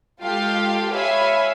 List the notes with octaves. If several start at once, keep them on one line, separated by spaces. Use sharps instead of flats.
G#3 F4 G4 A4 F5 G5
C#5 E5 F5 G#5 B5